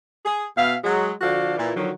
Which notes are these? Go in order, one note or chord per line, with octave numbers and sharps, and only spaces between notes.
G#4
B2 B3 E5 F5
F#3 G#3
D3 F3 F#4 A4 D5 F5
A#2 E3 E4
D3 D#3 F3 F#3